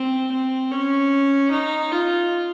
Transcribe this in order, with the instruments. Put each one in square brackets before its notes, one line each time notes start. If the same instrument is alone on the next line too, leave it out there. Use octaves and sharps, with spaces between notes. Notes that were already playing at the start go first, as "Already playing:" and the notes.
Already playing: [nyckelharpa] C4
C4
C#4
D#4
F4